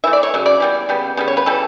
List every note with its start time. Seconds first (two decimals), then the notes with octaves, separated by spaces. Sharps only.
0.04 E3 A3 E5
0.13 D5
0.23 C#5
0.34 C#3 F#3
0.46 D5
0.60 E3 G3 B3
0.89 C#3 G3 B3
1.17 C#3 G3 B3
1.28 C#5
1.37 B4
1.46 C#3 E3 G3 A4